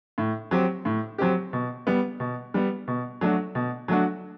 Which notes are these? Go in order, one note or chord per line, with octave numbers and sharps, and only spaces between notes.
A2
F#3 C4 G4
A2
F#3 C4 G4
B2
G3 B3
B2
G3 B3
B2
F#3 A3 D4 F#4
B2
F#3 A3 D4 F#4